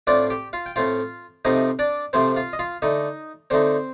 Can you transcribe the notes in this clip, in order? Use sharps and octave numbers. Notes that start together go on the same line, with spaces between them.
A2 A3 C4 D4 F4 D5
G4 G5
F4 F5
G5
A2 A3 C4 F4 F5
C3 F3 A3 C4 D#4 D#5
D4 D5
C3 F3 A3 C4 C5
F4 F5
D#5
F4 F5
D3 A3 D#4 D#5
D3 A3 C4 D#4 C5